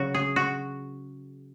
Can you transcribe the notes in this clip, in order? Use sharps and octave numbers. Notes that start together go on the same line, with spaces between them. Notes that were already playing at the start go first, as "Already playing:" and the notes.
Already playing: C#3 F#3 F#4
G#4
F#4